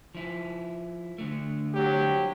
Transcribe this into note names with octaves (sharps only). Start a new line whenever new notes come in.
F3 E4
D3 A3
C2 F#3 G4